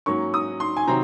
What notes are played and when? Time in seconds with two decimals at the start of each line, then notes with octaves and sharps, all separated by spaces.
0.06 G#2 F#3 A#3 C#4 C#6
0.34 D#6
0.60 C6
0.77 G#5
0.87 C3 D#3 F#3 C4 A#5